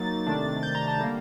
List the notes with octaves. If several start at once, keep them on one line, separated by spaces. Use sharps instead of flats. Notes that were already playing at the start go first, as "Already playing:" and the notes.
Already playing: F#3 A#3 D#4 A6
C3 D#3 A3 D4
G6
A#5
A5
D3 G3 A#3